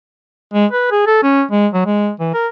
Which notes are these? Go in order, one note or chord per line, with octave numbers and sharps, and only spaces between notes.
G#3
B4
G#4
A4
C#4
G#3
F#3
G#3
E3
A#4